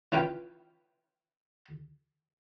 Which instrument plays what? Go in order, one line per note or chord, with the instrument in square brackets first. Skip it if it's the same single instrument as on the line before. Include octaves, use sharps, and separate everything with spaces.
[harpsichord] E3 C#4 F4 B4 G5